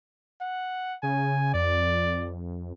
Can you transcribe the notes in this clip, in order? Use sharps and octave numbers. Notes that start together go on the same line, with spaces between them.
F#5
C#3 G#5
F2 D5